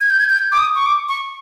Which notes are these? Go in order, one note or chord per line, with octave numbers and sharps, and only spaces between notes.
G#6
G6
G#6
G6
D6
D#6
C#6
D6
C#6